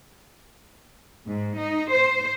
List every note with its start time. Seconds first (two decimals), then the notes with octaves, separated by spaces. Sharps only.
1.28 G#2
1.58 D#4
1.90 C5